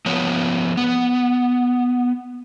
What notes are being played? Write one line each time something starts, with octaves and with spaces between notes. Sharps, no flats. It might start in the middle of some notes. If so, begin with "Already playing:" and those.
F3 B3 C#5
B3